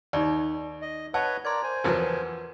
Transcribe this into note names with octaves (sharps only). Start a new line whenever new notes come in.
D#2 D#4 D5
D#5
B4 C#5 D#5 F#5 A5
A#4 D5 C6 G#6
C5 G#5
E2 F3 F#3 A#4 B4